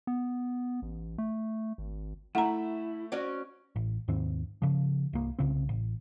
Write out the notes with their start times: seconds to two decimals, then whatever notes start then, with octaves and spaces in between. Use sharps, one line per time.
0.07 B3
0.82 A1
1.18 A3
1.78 G#1
2.35 A3 E4 E5 F#5 A#5
3.12 C#4 F#4 D5
3.76 A1
4.08 D#2 G#2 D#3 C4
4.62 C#3 F3
5.13 C2 A#3
5.39 C2 C#3 C4
5.69 A1